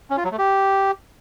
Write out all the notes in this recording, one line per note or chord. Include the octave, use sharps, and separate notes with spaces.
C#4
F4
F#3
A3
G4